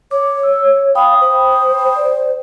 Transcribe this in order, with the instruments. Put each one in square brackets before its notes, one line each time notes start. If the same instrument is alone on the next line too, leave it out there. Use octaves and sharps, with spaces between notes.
[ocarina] C#5 [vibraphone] D6
[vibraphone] E6
[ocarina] F5 [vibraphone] G5 B5 D#6
[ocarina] C5
[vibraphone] D5